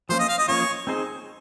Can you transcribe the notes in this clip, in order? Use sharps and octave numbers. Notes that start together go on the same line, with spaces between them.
F3 A#3 C#4 F4 C5
D#5
F5
D#5
F3 A#3 C#4 F4 C#5
C4 D#4 G#4 C5